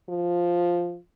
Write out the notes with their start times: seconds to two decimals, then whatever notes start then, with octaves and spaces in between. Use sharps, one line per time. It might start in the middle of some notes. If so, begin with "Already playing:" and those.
0.09 F3